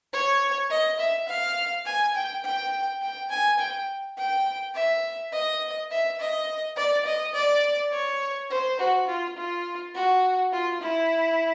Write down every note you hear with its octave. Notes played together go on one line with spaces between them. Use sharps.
C#5
D#5
E5
F5
G#5
G5
G5
G5
G#5
G5
G5
E5
D#5
E5
D#5
D5
D#5
D5
C#5
C5
F#4
F4
F4
F#4
F4
E4